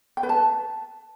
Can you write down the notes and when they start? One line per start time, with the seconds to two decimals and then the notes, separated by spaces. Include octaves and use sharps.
0.17 G5
0.23 B4
0.29 A5